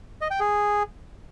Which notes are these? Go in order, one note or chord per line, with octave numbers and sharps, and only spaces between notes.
D#5
G5
G#4